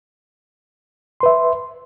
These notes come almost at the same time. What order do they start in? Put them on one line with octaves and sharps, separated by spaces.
C6 B4 E5